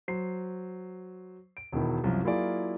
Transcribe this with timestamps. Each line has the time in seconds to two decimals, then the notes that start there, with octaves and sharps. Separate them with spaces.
0.08 F#3 C5 C7
1.57 D7
1.72 E1 B2 D#3 E4
2.04 C2 F#2 C3 F3
2.24 F#3 A#3 E4 F4 G#4 D5